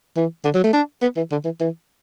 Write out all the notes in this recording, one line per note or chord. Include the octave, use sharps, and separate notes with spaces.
E3
D3
F#3
A3
D4
B3
E3
D3
E3
E3